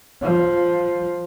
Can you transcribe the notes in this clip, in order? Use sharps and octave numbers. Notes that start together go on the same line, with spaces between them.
F3